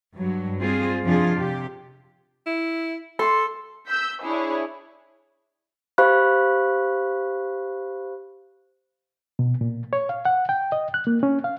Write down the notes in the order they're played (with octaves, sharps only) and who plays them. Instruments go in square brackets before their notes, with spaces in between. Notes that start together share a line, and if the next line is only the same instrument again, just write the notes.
[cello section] G2 F#3
G3 C4 F4 G#4
F2 C3 F3 D4 F4 G#4
C3 G4
[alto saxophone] E4
[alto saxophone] A4 [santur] C6
[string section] E6 G6 B6
D4 E4 G#4 C#5
[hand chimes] G4 C5 F5 B5 C#6 F#6
[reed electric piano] B2
A#2
C#5
F5
F#5
G5
D#5
F#6
A#3
C#4
F5